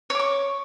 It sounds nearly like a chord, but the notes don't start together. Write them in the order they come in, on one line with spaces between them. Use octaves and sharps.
C#5 D6 C#6